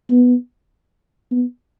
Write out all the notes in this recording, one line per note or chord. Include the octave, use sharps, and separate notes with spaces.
B3
B3